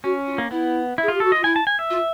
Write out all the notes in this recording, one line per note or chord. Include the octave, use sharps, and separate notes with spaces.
C#4 F#4
F4
A#3
B3 E4
E4 G#4
F4
G4
F#4 A4
F4 D#5
E4 G#5
A5
G#5
E5
F4